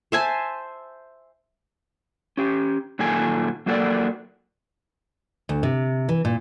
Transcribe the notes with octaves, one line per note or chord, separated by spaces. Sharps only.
C5 E5 G#5 A5
C#4 G4
A#2 D#3 F#3 A4 G#5
F#3 A#3 F#4 A4 A#4 D5
D2
C3
E3
A#2